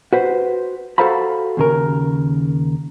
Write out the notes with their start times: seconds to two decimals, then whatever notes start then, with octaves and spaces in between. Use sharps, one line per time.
0.13 F#4 B4 C5
0.98 F#4 A4 C5 F5 A#5 B5
1.57 D#2 C#3 A#4